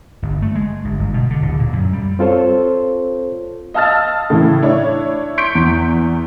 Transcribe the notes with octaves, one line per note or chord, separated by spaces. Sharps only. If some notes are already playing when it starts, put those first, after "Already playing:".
G1
A3
G#3
G1
G1
B2
D3
D1
A#2
F#2
G3
C4 F4 A4 C5 C#5
D#5 F5 A5 E6 F6 A6
A2 C#3 E3
D4 E4 C#5
C6 C#6 G6 B6 C#7 D7
E2